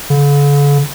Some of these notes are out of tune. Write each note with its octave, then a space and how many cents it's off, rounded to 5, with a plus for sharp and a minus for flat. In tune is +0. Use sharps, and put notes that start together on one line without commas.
D3 -45